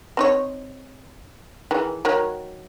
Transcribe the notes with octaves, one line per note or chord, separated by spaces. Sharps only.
C4 D#4 C#5
D#3 E3 G#4
D#3 F#3